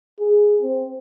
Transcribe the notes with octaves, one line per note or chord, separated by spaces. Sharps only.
G#4
C4